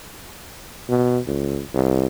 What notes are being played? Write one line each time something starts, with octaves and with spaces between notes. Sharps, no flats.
B2
C#2
C2